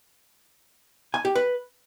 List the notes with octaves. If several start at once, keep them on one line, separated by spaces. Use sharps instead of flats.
G#5
G4
B4